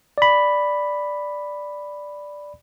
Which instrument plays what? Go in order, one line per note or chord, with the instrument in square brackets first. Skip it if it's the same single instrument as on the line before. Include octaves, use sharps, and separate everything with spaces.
[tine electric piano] D5 B5